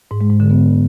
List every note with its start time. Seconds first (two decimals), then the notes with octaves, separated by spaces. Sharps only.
0.11 G#2
0.21 G#3
0.30 G#2
0.40 D3
0.50 B3